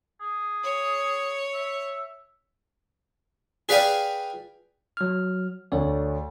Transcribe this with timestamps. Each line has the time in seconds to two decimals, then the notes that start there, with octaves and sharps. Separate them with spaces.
0.21 G#4
0.63 C#5
1.54 E5
3.69 G#4 B4 D5 F5 G5 G#5
4.97 F#3 F6
5.72 D2 A4 C#5 D5